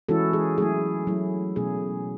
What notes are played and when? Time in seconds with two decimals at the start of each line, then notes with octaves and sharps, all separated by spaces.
0.09 E3 G#3 C#4 E4 F#4 A4
0.33 G#4
0.58 F#3 A3 E4 G#4
1.07 F#3 A3 E4
1.56 B2 A3 C#4 G#4